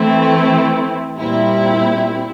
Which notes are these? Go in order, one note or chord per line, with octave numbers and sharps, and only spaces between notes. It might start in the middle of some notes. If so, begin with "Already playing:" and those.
Already playing: E3 A3 C4 E4
A#2 G3 C4 E4